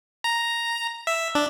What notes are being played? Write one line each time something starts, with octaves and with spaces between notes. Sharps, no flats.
A#5
E5
D4